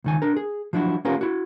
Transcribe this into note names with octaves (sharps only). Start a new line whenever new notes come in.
C#2 D#3 G#5
D4 A#4
G#4
F3 F#3 D4 E4 F#4
A#3 B3 C#4 F4 G4 A#4
E4 F#4